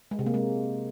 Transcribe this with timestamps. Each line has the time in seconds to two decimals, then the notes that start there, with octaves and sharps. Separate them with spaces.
0.11 G#3
0.19 C3
0.26 A#3
0.34 G#3